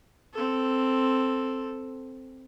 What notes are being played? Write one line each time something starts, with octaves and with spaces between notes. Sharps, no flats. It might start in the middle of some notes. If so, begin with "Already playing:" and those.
C4 A4